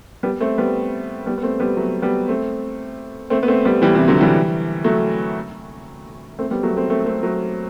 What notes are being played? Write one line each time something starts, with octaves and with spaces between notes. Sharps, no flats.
G3 B3
A3 C4
G3 B3
G3 B3
B3
A3 C4
G3 B3
F#3 A3
G3 B3
A3 C4
A3 C4
B3
A3 C4
G3 B3
E3 G3
C3 E3
D3 F#3
E3 G3
F#3 A3
A3 C4
G3 B3
F#3 A3
A3 C4
A3 C4
A3 C4
F#3 A3